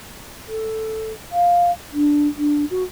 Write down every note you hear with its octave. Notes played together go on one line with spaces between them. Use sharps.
A4
F5
D4
D4
F#4